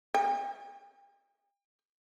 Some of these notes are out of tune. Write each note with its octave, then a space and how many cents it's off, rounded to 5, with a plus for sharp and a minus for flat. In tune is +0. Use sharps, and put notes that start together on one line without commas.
G5 +40